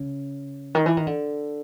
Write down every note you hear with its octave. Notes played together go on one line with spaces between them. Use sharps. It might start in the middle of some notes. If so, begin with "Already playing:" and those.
Already playing: C#3
D#3
E3
D#3
D3